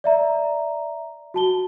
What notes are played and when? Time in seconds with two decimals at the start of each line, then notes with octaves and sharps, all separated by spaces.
0.04 D5 E5 A#5
1.34 F#4 A5 G7